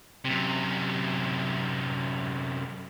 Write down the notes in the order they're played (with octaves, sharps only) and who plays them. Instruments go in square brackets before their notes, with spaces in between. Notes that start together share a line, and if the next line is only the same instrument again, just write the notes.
[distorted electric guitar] F#2 C3